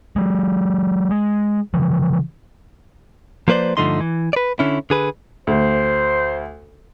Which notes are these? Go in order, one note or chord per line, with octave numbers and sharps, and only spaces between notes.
F#3 G#3
G#3
C#3 E3 F3
F3 A#3 B4 C5 D5
G2 D3 F3 A3 D#4 C6
E3
B4 D5
D3 C#4 E4
D3 G#4 B4
D2 C5